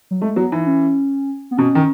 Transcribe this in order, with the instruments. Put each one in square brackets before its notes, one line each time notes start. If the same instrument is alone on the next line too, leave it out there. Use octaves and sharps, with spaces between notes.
[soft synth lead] F#3
[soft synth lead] G#3 [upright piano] A3
[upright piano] F#3 [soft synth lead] B3
[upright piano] E3 [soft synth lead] D#4
[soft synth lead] C#4
B3
[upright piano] B2 [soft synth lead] C#4
[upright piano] D#3